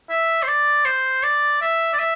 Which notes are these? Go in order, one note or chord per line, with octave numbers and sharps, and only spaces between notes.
E5
C5
D5
C5
D5
E5
D5
E5